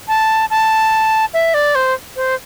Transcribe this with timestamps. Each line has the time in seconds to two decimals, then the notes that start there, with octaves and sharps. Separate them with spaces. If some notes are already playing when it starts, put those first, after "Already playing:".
0.08 A5
0.50 A5
1.34 E5
1.54 D5
1.75 C5
2.16 C5